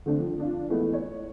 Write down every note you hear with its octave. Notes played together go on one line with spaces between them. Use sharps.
D3 A3 C4 D4
F3
D4 F4
E3 G#3 A3 B3
C#5